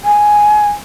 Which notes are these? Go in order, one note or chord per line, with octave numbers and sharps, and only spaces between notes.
G#5